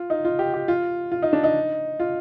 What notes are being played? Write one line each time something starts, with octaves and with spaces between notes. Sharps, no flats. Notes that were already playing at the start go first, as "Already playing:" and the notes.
Already playing: F4
D#4
F4
G4
G4
F4
F4
D#4
D4
D#4
F4